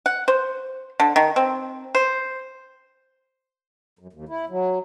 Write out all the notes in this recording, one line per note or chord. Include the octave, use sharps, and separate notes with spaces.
F#5
C5
D3
D#3
C4
C5
F#2
D#2
E4
F#3